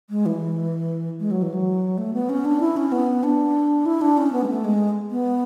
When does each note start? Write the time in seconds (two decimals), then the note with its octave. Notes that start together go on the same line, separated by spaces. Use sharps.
0.10 G#3
0.26 E3
1.20 G#3
1.31 F#3
1.42 E3
1.54 F#3
1.98 A3
2.14 B3
2.29 C#4
2.45 D4
2.60 E4
2.77 C#4
2.92 B3
3.23 D4
3.86 E4
4.01 D4
4.17 C#4
4.33 B3
4.44 G#3
4.48 A3
4.65 G#3
5.11 B3